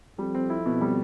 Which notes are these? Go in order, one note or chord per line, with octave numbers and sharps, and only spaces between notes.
F2 G3
C4
E4
B2
G3